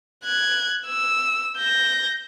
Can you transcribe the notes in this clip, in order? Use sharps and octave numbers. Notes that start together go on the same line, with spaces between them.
F#6 G#6
E6
G6 A#6